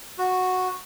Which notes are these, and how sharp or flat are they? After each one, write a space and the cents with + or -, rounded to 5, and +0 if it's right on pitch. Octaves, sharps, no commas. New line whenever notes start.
F#4 -5